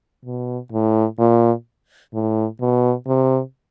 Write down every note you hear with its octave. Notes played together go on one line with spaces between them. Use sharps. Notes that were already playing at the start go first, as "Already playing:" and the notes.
B2
A2
A#2
A2
B2
C3